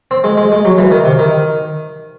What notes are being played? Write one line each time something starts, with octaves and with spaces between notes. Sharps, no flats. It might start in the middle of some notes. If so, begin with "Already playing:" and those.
C4
G#3
G#3
G#3
F#3
E3
D#3
C3
D#3